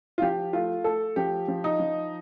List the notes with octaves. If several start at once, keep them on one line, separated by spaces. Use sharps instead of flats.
F4
F3 G4
A3 F4
A3 A4
F3 G4
F3
D#4
F3